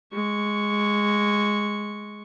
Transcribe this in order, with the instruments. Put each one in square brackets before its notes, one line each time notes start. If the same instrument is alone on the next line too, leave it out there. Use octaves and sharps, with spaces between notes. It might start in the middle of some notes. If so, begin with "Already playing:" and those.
[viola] G#3 C#6